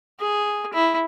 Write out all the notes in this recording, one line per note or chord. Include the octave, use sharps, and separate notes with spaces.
G#4
E4